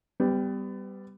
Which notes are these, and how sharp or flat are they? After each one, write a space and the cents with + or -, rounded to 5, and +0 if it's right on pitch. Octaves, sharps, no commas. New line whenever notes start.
G3 +0 B3 +30 G4 +0